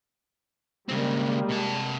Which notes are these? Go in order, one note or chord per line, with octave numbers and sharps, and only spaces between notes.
C#3 G3 G#3 A#3 C4
C3 A5